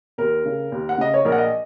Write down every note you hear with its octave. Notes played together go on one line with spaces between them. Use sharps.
D#2 A#4
C#3
D#2
F#5
C#3 D#5
C#5
A#1 A#4
F#5
D#5